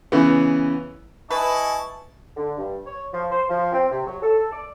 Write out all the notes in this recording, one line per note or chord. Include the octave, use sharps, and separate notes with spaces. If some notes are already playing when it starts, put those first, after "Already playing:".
C#3 E3 B3
E4 B4 D#5 G#5 A5 C#6
D3
G2
C#5
F3
C5
F3
C4
C3
F#3
A4
D5